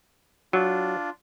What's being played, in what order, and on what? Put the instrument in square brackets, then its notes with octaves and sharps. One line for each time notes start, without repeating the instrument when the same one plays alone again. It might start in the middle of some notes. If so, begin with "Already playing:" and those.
[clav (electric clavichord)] F#3 [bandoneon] D4 F4